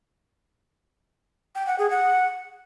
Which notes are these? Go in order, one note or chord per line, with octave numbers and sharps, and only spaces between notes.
G5
F#5
G#4
F#5